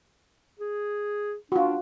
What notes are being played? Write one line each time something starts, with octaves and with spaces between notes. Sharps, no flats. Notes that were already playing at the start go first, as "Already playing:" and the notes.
G#4
D4 F4 F#4